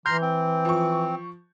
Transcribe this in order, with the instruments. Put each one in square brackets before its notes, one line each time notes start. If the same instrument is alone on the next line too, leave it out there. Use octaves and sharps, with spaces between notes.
[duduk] E3 [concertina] A#5 C6 F6 [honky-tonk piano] G6
[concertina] C4
[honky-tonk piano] F3 C#6